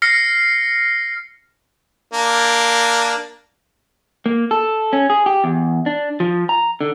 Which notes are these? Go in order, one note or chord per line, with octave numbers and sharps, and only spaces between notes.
F6 A#6 C7 C#7
A#3 D4
A#3
A4
C#4
G#4
G4
E2
D4
F3
A#5
D3